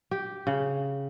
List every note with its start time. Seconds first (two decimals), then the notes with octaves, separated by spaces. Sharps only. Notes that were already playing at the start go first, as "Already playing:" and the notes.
0.11 G4
0.47 C#3